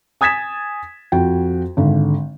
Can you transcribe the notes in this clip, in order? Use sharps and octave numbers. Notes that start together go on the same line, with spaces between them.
G#5 D#6 G#6 A6 B6 E7
F2 F#4 G5
G#1 D3